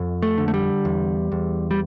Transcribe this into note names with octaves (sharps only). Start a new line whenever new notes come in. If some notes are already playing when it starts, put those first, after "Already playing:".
Already playing: F2
A3
D3
A3
G3
E2
E2
G3